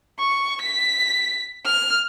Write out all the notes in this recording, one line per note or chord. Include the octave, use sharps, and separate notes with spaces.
C#6
B6
F6